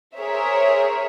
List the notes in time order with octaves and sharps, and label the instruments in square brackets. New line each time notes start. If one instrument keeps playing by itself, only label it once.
[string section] G#4 A#4 C5 C#5 E5